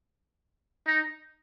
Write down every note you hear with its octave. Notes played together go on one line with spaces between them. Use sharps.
D#4